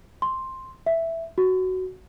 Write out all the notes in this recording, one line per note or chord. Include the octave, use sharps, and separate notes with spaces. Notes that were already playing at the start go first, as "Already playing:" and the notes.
C6
E5
F#4